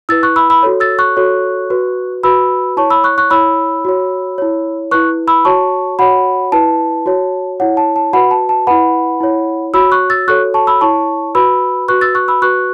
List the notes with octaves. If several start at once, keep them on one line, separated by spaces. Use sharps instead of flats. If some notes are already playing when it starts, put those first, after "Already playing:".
E4 B4 E6 A6
C#6 F#6
B5 E6
B5 E6
F#4 A4 C#5
E6 A6
C#6 F#6
F#4 A4 C#5
F#4 B4
F#4 B4 B5 E6
E4 C#5 A5 C#6
B5 E6
C#6 F#6
C#6 F#6
E4 C#5 B5 E6
F#4 C#5
E4 C#5
E4 B4 C#6 F#6
B5 E6
F#4 C#5 A5 C#6
F#4 C#5 F#5 B5
E4 B4 A5
F#4 C#5
E4 C#5 F#5
A5
A5
F#4 B4 F#5 B5
A5
A5
E4 B4 F#5 B5
E4 C#5
F#4 C#5 B5 E6
C#6 F#6
E6 A6
F#4 A4 C#5 C#6 F#6
A5 C#6
B5 E6
E4 C#5 A5 C#6
F#4 B4 B5 E6
F#4 B4 C#6 F#6
E6 A6
C#6 F#6
B5 E6
F#4 B4 C#6 F#6